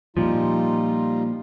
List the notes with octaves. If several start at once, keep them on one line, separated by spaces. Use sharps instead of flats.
A#2 F3 G3 D#4 F4